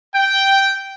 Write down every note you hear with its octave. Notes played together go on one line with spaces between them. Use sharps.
G5